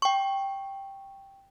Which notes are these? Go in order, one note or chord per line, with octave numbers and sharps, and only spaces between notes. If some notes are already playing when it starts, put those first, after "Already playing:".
G5 C#6